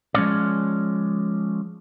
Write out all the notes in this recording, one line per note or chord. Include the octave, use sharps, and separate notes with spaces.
F3 G#3 B3 C#4 C#5 D5